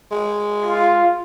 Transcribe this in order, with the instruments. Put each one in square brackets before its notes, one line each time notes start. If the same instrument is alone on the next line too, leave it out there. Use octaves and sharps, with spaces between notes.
[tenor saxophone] G#3
[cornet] F4